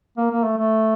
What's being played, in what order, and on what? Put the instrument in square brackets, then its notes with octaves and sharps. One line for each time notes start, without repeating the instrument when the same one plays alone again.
[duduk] A#3
A#3
A3
A3